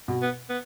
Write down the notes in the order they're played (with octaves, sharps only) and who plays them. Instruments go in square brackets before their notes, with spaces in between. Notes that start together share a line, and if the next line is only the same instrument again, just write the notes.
[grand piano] B2
[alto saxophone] B3
B3